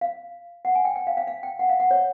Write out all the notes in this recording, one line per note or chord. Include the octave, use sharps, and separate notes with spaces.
F5
F#5
G#5
G5
G5
F5
F5
F5
G5
F#5
F5
F#5
C#5